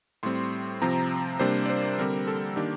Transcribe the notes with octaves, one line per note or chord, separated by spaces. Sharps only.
A2 G3 C4 C6
C3 F3 C4 A#5
C3 G3 A#3 D4 C5
D5
C5
D3 G3 C4 A#4
A4
D#3 A#3 D4 G4